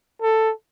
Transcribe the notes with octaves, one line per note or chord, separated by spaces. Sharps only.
A4